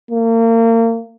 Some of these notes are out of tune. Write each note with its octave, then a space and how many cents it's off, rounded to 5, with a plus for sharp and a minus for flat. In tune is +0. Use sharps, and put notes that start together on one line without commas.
A#3 -35